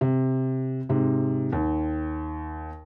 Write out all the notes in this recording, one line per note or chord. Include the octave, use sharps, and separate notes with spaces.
C3
G#2 C3
D#2